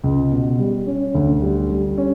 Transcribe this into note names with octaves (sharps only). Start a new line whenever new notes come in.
C#2
B2
G3
C#4
D2
G3
G3
C#4